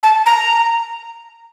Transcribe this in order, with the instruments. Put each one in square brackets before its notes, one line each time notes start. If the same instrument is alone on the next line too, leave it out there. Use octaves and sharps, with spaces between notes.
[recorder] A5
A#5